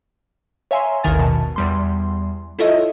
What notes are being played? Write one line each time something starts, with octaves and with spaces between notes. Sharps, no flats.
C#5 E5 F5 G#5 A#5 C6
A1 D#2 D#3 A#4 G#5 A6
B2 A5
E2 G3 C6
E4 F4 A4 C#5 D#5 E5